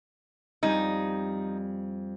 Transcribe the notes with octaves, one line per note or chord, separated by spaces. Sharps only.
F2 G3 D#4 G#5